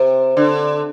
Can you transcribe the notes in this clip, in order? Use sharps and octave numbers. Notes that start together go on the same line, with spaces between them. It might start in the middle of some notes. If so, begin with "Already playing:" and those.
Already playing: C3
D3